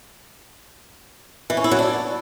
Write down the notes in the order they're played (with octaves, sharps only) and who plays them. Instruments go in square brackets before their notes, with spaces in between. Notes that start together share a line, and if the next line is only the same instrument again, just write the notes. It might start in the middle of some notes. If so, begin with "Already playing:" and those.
[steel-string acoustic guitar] E3
C#4
E4
F#3
D4